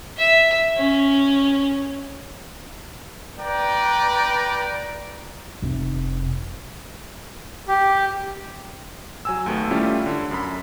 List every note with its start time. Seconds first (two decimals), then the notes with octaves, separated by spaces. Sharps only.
0.17 E5
0.76 C#4
3.40 B4 D5 G5 A#5
5.62 F1
7.68 G4
9.25 F#3 G#5 E6
9.46 D#2 A3 B3
9.71 G3 A3 C#4 E4 F4 G4
10.06 D3
10.31 F#2 B5